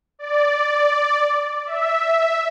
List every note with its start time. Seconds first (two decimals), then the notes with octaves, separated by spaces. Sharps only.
0.19 D5
1.66 E5